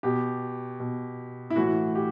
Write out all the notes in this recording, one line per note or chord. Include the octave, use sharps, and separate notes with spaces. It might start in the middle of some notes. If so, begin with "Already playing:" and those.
B2 G4
B2
E4
A2 E3 F#4
G4